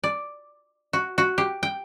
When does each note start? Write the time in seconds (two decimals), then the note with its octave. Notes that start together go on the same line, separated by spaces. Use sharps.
0.03 D5
0.93 F#4
1.18 F#4
1.38 G4
1.63 G5